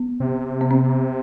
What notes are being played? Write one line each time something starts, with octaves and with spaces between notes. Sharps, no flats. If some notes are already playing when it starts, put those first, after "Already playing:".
Already playing: B3
C3
B3
C4